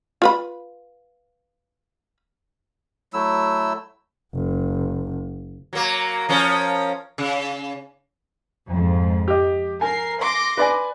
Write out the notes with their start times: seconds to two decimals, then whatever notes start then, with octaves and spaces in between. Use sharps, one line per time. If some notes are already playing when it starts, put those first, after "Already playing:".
0.22 F4 B4 B5
3.13 F#3 A3 E4 E6
4.35 F#1
5.73 F#3 A#3
6.29 F3 C#4 A#4
7.18 C#3
8.68 F2 G#2
9.28 G4 D#5
9.81 A#4 G#5 C7
10.20 C6 D6 A#6
10.57 B4 D5 G#5